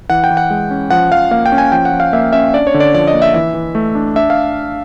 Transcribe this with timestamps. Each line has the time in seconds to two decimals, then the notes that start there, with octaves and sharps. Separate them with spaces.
0.10 E3 F#5
0.24 G5
0.30 E3
0.37 F#5
0.50 G#3
0.71 C#4
0.90 F3 F#5
1.11 F3 F5
1.31 A#3 F5
1.46 G5
1.52 C#4
1.58 G#5
1.72 F3 G5
1.85 F#5
1.92 F3
2.00 F5
2.13 A#3 E5
2.33 C#4 E5
2.54 D4 D5
2.67 C#5
2.74 D3
2.80 D5
2.94 F3 D5
3.08 D#5
3.14 A#3
3.22 E5
3.34 E3 E5
3.54 E3
3.75 A3
3.95 D4
4.16 D4 E5
4.30 F5